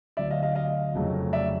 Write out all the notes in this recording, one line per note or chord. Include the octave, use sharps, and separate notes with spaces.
D2 D3 F#3 D5 E5
D#5 F5
D#5 F5
D#5 F5
F1 F2 C#3 F#3 A3
D5 E5